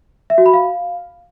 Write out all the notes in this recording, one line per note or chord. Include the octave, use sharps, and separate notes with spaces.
E5
F#4
B5
F5